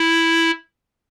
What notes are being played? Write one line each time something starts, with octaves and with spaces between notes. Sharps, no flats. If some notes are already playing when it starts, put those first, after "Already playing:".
Already playing: E4